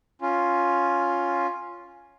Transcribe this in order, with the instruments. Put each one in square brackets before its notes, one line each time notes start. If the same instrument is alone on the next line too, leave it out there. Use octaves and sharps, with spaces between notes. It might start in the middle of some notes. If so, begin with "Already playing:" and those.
[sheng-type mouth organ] C#4 F4